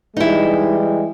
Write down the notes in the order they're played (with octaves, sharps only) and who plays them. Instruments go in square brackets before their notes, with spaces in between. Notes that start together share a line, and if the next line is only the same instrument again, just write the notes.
[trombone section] E3 G3 G#3 [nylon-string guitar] D#4 E4